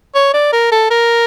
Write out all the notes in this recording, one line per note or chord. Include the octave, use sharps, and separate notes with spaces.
C#5
D5
A#4
A4
A#4